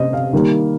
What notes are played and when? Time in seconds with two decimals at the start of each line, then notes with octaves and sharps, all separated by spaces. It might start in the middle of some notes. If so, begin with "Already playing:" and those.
Already playing: C3 C5 D#5
0.13 F5
0.33 D#3 G3 A#3